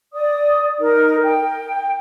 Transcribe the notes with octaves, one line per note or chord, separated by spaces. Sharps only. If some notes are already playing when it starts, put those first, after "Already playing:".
D5 D#6
D#4 A#4
G5